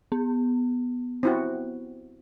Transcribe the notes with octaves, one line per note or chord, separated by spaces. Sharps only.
B3
C4 E4 F#4